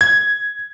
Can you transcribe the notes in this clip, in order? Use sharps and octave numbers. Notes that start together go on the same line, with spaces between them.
G#6